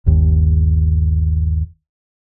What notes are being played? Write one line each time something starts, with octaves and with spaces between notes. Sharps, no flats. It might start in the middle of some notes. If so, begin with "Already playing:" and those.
G1 D#2